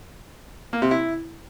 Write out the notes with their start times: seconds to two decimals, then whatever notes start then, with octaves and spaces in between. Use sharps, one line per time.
0.73 A#3
0.82 C3
0.91 E4